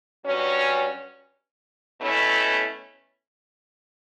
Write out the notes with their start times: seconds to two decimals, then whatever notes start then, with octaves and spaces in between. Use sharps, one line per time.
0.24 G2 F#3 C#4
2.00 B2 A3 C#4 E4